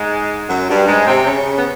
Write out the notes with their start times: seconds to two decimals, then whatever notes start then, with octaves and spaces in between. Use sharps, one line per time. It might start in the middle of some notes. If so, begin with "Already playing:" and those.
Already playing: G#2 G#3
0.49 F#2 F#3
0.69 G2 G3
0.87 G#2 G#3
1.06 C3 C4
1.25 C#3 C#4
1.58 B3